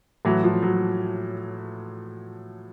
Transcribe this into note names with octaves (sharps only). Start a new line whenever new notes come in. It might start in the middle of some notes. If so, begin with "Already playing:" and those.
A2 E3 F#3
F3
F#3